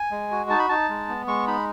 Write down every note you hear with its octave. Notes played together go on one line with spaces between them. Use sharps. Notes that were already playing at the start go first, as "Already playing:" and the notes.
Already playing: G#5
G#3
F#4
D#4 A5
B5
D#4 A5
G#3
B3
G#3 C#6
D#4 B5